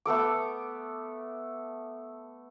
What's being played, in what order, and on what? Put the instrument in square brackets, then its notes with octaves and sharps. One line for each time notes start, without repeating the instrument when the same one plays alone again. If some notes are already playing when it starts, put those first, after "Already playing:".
[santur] A3 B3 A4 D6